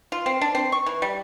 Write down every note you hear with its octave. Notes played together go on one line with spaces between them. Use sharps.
F4
C4
D4
C4
C#6
E3
G3